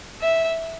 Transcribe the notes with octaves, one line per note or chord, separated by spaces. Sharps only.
E5